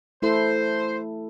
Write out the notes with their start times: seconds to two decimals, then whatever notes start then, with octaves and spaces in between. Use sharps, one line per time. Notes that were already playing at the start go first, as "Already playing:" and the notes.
0.22 A3 E4 A4 C5